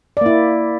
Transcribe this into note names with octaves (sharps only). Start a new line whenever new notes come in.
A#3 E4 D5